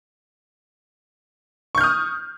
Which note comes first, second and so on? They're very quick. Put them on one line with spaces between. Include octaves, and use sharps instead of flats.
C#6 G6 F6 D#6